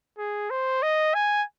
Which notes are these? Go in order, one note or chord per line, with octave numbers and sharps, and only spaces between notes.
G#4
C5
D#5
G#5